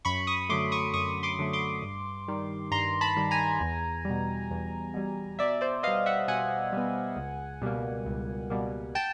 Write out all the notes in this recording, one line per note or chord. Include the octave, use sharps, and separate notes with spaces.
F#2 B5 C#6
C#6 D#6
D3 F#3 A3 C6 D6
C#6 D#6
F#2 C#6 D#6
C6 D6
D3 F#3 A3
C6 D6
G2
D#3 G3
G2 A#5 C6
A5 B5
D#3 G3
G#5 A#5
E2
B2 G3
E2
B2 G3
B2 D5 E5
C5 D5
G3 B3 D#5 F5
E5 F#5
B2 F#5 G#5
G3 B3
C#2
B2 G3 A#3
C#2
B2 G3 A#3
G5 A5